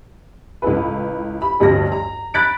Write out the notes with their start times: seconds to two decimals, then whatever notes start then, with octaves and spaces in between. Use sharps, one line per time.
0.62 C#2 A2 A4 B4
1.42 B5
1.60 A1 D2 G2 A#6
1.92 A#5
2.34 B5 F#6 A6 B6 D7